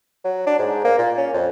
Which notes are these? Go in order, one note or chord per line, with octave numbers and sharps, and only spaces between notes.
F#3
D4
G#2
A#3
A#2
C#4
F2